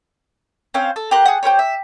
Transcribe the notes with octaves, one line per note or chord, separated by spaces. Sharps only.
C4 C#4 C5 F5
A4
G4 A#4 C6 F#6
G#4 F#5
G4 A#4 C5 C#5
E5